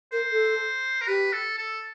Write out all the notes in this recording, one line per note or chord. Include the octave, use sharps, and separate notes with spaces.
A#4 C5
A4
A#4
G4 B4
A4
A4